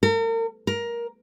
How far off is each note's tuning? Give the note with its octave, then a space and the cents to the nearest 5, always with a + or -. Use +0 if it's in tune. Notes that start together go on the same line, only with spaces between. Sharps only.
A#4 -40
A#4 +15